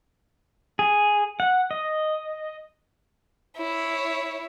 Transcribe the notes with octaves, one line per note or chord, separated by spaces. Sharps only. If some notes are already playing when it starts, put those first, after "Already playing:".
G#4
F#5
D#5
E4 C#5